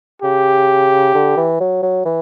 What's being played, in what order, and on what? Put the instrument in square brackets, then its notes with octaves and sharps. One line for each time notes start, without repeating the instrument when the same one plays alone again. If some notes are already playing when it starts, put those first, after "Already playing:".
[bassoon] C#3 [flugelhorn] G4
[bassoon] D3
E3
F#3
F#3
E3